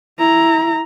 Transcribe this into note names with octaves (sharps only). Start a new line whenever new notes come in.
E4 A#5